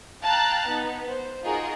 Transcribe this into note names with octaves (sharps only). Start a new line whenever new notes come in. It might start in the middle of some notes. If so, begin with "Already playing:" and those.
F5 G5 A5 A#5 F#6 A6
B3 D#4
C5
D#4 F4 F#4 G#4 A#4 D#5